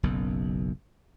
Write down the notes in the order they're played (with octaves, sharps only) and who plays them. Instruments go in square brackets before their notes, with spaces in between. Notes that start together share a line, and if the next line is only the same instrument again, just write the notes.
[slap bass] F#1 B1 F#2